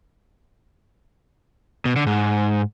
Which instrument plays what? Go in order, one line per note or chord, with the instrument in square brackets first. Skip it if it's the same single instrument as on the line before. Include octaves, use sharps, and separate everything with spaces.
[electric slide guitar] B2
D3
G#2